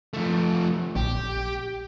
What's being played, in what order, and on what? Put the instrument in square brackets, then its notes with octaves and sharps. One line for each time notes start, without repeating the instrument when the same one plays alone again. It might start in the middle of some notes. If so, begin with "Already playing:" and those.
[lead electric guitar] F3 A3
[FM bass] A#1 [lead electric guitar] G4